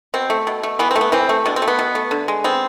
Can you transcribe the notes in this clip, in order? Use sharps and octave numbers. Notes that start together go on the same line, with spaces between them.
B2 C4
A3
B2
A3
E3 B3
A3 C4
B3
E3 C4
A3
B2 D4
C4
A3
B3
B2
A3
D3
G#3
B3 C4